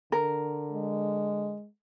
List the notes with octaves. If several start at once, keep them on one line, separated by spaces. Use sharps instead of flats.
D3 A#4
G#3